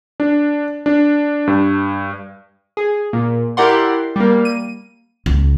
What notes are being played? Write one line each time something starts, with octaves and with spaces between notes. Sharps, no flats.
D4
D4
G2
G#4
A#2
E4 G4 A#4 D5 F#5 C6
G3 A#3
D#7
C#2